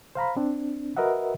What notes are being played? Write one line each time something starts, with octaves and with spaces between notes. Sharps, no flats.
C5 F5 A#5 B5
C4 D4
F#4 A#4 B4 D#5 E5 F#5